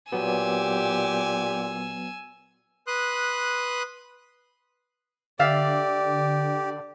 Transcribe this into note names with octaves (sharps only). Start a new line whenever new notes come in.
A#2 F#3 B3 G4 G#5 E6
B4 C6 D#6 F#6
D3 G4 D5 E5 F5 A6